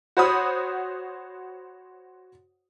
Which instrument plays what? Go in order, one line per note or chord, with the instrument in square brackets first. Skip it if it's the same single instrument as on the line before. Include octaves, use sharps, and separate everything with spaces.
[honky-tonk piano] F#4 C5 C#5 F#5 B5 D#6